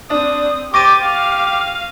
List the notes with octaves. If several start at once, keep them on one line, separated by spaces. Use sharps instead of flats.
C4 D4 D#6
G4 C5 C#6 D6 A6 A#6 D#7
G4 F5